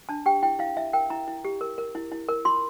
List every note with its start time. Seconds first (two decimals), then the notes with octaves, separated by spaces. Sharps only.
0.09 D4 A5
0.26 G4 G5
0.43 E4 G5
0.59 E4 F5
0.76 E4 E5
0.93 A#4 G5
1.10 E4 A#5
1.27 E4
1.45 G4
1.61 A#4
1.78 A#4
1.95 E4
2.12 E4
2.28 A#4
2.45 F4 C6